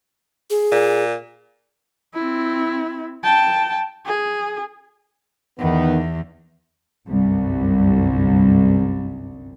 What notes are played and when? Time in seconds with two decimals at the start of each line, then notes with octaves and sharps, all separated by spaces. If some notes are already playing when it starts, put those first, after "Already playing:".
0.50 G#4
0.71 A#2
2.14 C4 E4
3.23 G5 A5
4.06 G#4
5.58 E2 D#3 B3
7.08 G1 C2 F#2